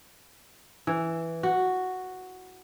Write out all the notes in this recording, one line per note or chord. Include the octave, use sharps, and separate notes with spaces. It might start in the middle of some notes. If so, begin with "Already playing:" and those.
E3
F#4